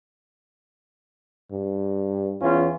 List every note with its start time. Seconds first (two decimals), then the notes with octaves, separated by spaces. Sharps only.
1.51 G2
2.42 E2 E3 C#4 F4